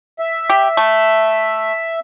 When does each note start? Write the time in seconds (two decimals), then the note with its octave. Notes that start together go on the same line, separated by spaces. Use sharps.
0.19 E5
0.50 G4
0.77 A3